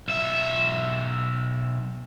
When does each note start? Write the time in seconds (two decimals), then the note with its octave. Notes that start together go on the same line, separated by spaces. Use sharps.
0.08 B1 E5